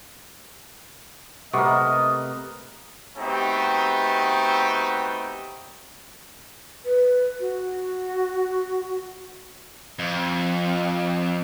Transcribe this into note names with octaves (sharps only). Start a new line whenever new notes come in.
C3 A3 B3 A#4 D#5 C#6
A3 B3 C4 D#4 F#4 G4
B4
F#4
F2